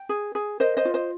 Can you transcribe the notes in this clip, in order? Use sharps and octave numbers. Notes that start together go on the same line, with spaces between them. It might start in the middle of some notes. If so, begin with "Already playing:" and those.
Already playing: G5
G#4
G#4
A#4 C5 D#5
C5 D#5
F4
C5 D#5